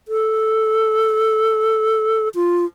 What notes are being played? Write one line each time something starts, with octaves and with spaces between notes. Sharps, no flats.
A4
F4